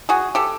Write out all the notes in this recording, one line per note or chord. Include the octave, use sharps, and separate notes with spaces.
F#4 G#4
G4 A4